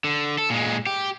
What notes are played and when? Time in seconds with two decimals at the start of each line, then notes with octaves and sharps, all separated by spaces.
0.04 D3
0.38 A4
0.50 A#2 G#3
0.87 G4